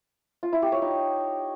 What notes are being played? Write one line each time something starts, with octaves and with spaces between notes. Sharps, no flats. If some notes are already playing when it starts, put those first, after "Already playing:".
F4
E4
G4
C#5
D#4